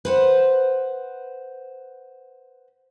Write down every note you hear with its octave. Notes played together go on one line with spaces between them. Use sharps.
B4 C5 F#5